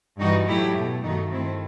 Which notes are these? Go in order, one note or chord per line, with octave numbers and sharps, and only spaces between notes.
G2 E3 G3 D#4 F#4
A2 F#3 A3 E4 G4
B2 A3
G2 D#3 A3 D#4 F#4
G2 D#3 A3 C4 E4